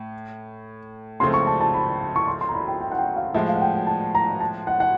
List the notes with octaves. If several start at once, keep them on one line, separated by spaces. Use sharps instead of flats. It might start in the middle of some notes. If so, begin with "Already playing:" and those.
Already playing: A2
C#2 C#3 F3 A3 C4 C6
C#6
A5
A5
B5
C#6
C6
C6
A#5
B5
G5
G5
F#5
G5
F5
A2 F3 G#3 E5
F5
F#5
G5
G5
A5
A#5
A5
F#5
F#5